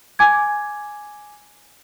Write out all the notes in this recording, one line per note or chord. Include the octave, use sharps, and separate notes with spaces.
G#5 D6 G#6